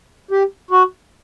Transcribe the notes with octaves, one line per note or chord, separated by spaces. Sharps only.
G4
F#4